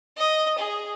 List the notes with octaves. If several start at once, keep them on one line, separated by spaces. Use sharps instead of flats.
D#5
G#4